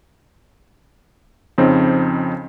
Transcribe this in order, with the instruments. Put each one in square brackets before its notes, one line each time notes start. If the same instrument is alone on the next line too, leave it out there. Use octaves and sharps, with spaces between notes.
[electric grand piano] F2 C#3 C4 D#4